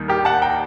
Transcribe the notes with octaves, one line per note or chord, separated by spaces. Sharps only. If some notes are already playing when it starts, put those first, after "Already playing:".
Already playing: D#2 D#3 G3
G4 A#4
F#5 A5
G5 A#5